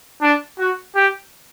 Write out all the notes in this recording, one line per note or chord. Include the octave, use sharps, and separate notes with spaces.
D4
F#4
G4